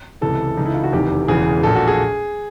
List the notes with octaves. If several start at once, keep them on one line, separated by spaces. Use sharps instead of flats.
C#2 C3 E3 A4
C#2 C#3 E3 D#4
E4
F4
F#4
F1 E2 C3 D#3 G4
E1 E2 C#3 E3 G#4
A#1 A#2 A4
F#4
G#4